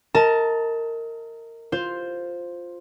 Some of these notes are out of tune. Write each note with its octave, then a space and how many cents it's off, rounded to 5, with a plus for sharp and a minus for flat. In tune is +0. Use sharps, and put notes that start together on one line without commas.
A#4 -20 D#5 +30 A5 +0
F4 +5 C5 +0